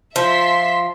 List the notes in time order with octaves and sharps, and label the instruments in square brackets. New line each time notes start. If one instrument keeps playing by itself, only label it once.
[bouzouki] F3 [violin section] E5 C6 B6